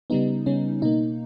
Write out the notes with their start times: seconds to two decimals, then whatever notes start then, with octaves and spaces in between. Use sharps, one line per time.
0.10 C#3 G3 B3 D#4
0.46 C#3 G3 B3 C#4
0.82 B2 A#3 D#4